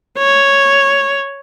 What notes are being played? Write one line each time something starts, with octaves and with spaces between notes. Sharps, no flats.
C#5